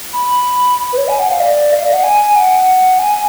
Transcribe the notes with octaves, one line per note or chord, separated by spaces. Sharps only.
B5
B4
C#5
G#5
F#5
F5
D5
F5
D5
F#5
G#5
F#5
G#5